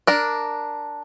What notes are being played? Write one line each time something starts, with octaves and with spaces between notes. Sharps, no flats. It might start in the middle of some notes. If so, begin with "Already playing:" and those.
D4 A#4